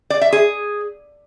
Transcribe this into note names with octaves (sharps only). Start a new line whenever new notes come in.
D5
E5
G#4